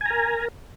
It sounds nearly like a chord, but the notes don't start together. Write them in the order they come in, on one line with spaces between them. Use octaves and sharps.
G#5 A#5 A#4